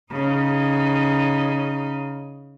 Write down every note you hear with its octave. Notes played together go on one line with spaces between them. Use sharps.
C#3 D#4